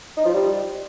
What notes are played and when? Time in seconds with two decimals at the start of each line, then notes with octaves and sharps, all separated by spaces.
0.17 D#4
0.25 F3
0.33 G3